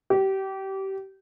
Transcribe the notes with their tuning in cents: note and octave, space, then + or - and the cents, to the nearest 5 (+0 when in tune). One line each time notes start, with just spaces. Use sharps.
G4 -25